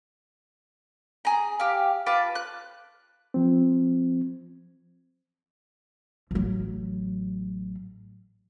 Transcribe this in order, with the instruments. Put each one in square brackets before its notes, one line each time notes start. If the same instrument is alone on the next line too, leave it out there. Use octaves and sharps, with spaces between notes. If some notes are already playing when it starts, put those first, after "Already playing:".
[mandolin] G#4 A#5
G4 F5
F4 B4 A5 D6
F#6
[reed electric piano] F3 C4
[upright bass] A1 F#3